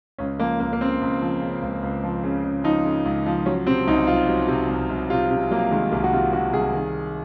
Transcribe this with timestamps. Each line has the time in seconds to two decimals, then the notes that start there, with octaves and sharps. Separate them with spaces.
0.18 C#2 C#4
0.40 F3 A#3
0.60 C#2 A#3
0.73 A#3
0.81 C#3 C4
1.01 C#2
1.22 F3
1.41 C#3
1.62 C#2
1.82 C#2
2.03 F3
2.24 C#3
2.44 C#3
2.64 F3 D#4
2.85 C#3
3.05 C#2
3.26 F3
3.46 F#3 C#4
3.67 C3 C4
3.87 C2 D#4
4.07 F#3 F4
4.29 F#3
4.48 C3
4.69 C2
4.90 C2
5.10 C3 F4
5.31 C3
5.51 F#3 A#3
5.71 D#3 G#3
5.92 C2 A#3
6.04 F#4
6.13 C3 F4
6.33 D#3 F#4
6.53 C2 G#4
6.74 D#3